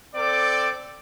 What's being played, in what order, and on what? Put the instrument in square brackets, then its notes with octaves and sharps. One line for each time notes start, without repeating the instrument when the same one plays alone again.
[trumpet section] C4 A4 D5 D6